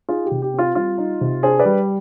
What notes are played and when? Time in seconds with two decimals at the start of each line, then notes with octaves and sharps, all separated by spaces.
0.09 D#4 F4 G#4
0.26 G4
0.31 C3
0.42 G4
0.54 C4
0.59 F4
0.75 G3 F4
0.98 D#4
1.21 C3
1.43 D4 G#4 C5
1.59 B4 D5
1.65 G3